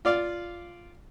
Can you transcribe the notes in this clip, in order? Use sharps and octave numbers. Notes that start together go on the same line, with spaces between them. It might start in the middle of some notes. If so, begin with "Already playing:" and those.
F4 D5 F5